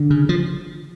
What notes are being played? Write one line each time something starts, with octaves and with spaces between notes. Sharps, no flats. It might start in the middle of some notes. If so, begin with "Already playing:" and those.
Already playing: D3
C#3
F3